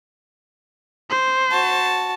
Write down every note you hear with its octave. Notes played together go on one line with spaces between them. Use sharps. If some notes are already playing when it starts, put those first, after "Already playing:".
C5
F#4 A5